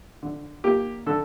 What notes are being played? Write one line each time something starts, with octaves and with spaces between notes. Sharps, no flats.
D3
A#3 G4
D3 A4